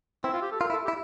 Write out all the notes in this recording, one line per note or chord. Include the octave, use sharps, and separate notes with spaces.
C4 E4
F4
G4
A4
F4 A#4
E4
A4
G4
E4